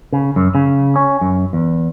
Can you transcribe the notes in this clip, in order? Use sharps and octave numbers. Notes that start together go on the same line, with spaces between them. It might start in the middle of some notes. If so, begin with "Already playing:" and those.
C#3
F#2
C#3
C#4
F#2
E2